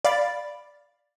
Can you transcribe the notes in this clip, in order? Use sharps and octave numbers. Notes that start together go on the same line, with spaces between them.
D5 F5 B5 A6